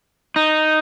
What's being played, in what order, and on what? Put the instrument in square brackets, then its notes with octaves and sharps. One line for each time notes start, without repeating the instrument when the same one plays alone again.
[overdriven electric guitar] D#4